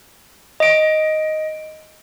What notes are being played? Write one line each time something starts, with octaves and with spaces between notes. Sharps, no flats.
D#5 D7